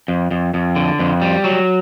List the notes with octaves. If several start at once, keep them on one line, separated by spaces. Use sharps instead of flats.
F2
F2
F2
D3
F2
G3
F#3